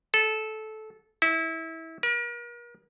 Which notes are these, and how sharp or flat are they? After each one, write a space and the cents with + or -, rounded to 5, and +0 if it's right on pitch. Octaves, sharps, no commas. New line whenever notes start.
A4 -15
E4 -25
A#4 +40